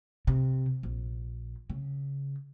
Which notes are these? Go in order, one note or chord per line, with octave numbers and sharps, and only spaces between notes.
C3
A#1
C#3